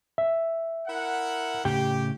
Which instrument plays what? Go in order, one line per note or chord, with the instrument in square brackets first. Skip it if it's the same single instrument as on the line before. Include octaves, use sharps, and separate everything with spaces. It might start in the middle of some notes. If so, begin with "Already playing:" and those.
[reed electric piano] E5
[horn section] E4 A#4 F#5
[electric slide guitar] A2 C#3 G5 [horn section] G4